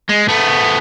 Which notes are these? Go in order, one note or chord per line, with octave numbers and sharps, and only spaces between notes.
G#3
A3 B3